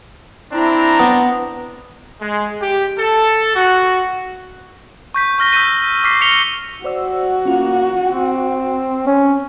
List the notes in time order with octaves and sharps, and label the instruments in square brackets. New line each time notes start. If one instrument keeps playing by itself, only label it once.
[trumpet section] C4 D4 A#5 [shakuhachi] E4
[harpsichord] B3
[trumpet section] G#3
G4
A4
F#4
[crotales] C#6 G6 B6
C#6 F6 A#6 G7
E6 G6 B6 D#7
D6 F6 B6 C7
A#6 B6 C#7 F7 G7
[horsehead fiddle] F#4 [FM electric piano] C5 D5 E6
[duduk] A#3 [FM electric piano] C#4 F4
[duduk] C4 [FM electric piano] G5
[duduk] C#4 [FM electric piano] C#5